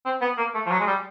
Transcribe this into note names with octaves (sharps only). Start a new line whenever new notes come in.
C4
B3
A#3
A3
F3
F#3
G#3
G3